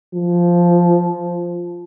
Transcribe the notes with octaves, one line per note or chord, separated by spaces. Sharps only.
F3